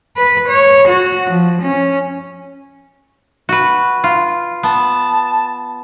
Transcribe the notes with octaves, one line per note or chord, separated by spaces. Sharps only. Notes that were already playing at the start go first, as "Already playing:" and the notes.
B4
C#5
F#4
F3
C#4
F#4 B4
F4
B3 A5